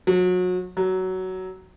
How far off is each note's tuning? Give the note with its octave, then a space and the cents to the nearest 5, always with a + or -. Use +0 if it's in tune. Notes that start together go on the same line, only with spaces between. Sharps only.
F#3 -30
F#3 +15